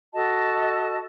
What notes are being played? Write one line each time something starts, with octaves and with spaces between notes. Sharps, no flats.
F#4 A4 D#5 A5